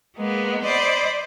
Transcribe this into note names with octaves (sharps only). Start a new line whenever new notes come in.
G#3 A#3 B3
C5 D5 D#5 B5